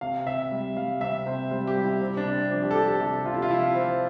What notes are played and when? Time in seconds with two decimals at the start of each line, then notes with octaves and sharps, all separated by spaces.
0.01 C3 F5
0.26 C3 E5
0.51 G3
0.77 G3 F5
1.01 C3 E5
1.26 C3 C5
1.51 G3 C5
1.67 G4
1.76 G3
1.84 E4
2.01 C3 C4
2.17 D4
2.26 C3
2.34 C4
2.51 F3 D4
2.63 G4
2.71 A4
2.75 F3 G4
2.89 A4
3.01 C3 G4
3.25 C3 F4
3.34 E4
3.42 F4
3.50 F3 E4
3.75 F3 C4